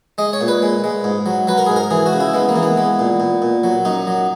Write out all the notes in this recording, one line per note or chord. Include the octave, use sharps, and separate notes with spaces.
G#3 D#5
C#5
A#2
B4
G#3
G#3
G#2
F#3
F#3 B4
A#4
G#2 G#4
A#4
E3 G#4
F#4
C#3
E4
G#3 B3
A#3
E3
B3
G#3
A#2
A#2
A#2
F#3
F#2 D#4
F#3